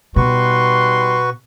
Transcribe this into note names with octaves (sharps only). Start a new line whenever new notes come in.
B2 G3 D#4 F#4 B4 C6 C#6